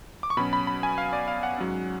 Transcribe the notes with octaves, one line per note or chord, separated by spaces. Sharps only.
D6
C#6
B2 F#3 C#4 B5
B5
B5
G#5
F5
D5
F5
F#5
G#2 F#3 C#4